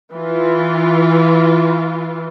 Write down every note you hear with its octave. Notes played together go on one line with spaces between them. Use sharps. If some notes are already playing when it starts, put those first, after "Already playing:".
E3 F4